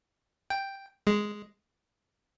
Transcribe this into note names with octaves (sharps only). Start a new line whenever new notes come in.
G5
G#3